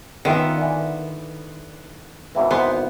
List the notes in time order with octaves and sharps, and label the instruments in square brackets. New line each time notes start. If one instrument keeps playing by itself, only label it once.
[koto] D#3 [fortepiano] B3 F4 E5 [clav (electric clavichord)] C#4
[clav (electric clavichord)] D3 E3
G#1 E2 E3
[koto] B3 [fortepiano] C5 C6